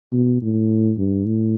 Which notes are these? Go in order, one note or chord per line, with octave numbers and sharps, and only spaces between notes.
B2
A2
G2
A2